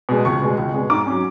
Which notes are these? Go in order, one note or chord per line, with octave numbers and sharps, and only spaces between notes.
B2 G#3
C#2 C#6
B2 G#3
C#2
B2 G#3
G#2 D6
F#3 C#4